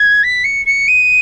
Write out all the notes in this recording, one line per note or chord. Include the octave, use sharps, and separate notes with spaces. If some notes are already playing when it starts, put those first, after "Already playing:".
Already playing: G#6
B6
C#7
C#7
D#7